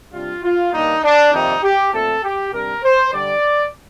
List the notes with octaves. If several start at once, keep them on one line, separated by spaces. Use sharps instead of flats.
C3 G3 D4 F4
F4
G2 D#3 A#3 D4 D#4
D4
F2 C3 D#3 G3 A#3 D#4
G4
A#2 A3 C4 A4
G4
C3 G3 D4 A#4
C5
D3 G3 D4 D5